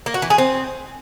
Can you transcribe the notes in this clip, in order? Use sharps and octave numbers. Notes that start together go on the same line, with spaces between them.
A#3
F#4
E3
G#4
C4